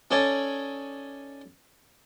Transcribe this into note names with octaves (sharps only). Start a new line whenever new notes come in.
C#4 D#4 A4 C#5 D5